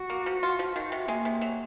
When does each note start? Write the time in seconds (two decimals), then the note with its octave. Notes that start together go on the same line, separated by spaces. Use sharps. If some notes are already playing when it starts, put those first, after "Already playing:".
Already playing: F#4
0.10 A#3
0.26 F3
0.43 F4
0.59 F3
0.75 D#3 F#4
0.92 C3
1.08 G#3 A#3
1.25 C3
1.41 F#3